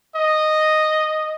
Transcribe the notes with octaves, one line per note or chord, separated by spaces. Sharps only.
D#5